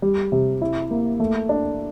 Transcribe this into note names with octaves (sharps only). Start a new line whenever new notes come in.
G3
C3
E4
A#3
A3
D4